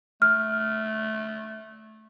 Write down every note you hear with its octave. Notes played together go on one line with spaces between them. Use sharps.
A3 F6